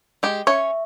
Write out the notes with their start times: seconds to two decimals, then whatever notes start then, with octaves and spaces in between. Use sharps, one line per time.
0.23 G#3 G4
0.47 C#4 C#5 E5 C#6